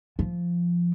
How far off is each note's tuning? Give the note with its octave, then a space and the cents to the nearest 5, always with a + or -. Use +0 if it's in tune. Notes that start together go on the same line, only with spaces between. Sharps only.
F3 -5